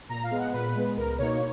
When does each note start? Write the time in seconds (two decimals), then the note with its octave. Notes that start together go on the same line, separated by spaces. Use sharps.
0.09 A#2 A#5
0.23 F5
0.31 G#3 B3
0.38 F#5
0.53 A#2 B4
0.75 G#3 B3
0.97 C#2 A#4
1.18 B2 A#3 D#4 C#5